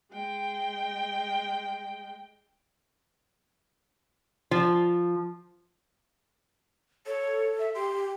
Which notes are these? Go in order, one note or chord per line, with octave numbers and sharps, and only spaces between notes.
G#3 G5
F3
A4 C#5
E5
G4 C6